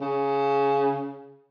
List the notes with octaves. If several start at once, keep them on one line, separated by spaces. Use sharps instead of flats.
C#3